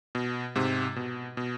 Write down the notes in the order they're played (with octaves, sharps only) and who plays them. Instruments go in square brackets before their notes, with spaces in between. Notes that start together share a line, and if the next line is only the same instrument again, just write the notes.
[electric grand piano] B2
G#2 C3
B2
B2